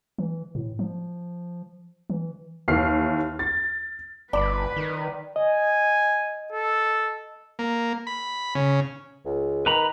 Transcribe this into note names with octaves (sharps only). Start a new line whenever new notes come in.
E3
A2
F3
E3
D#2 E3 F6 C7
A6
G1 B4 D5 B5
D#3
D#5 G#5
A4
A#3
B5
C#3
C#2
D#3 B4 A#5 B5